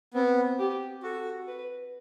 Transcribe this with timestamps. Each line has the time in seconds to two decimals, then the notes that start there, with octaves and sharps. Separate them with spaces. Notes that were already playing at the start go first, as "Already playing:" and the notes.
0.14 B3 C4
0.59 G4
1.03 F#4 A4
1.47 B4